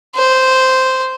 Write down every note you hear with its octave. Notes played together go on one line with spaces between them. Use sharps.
C5